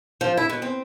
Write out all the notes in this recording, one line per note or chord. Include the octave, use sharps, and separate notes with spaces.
F3
E4
B2
C4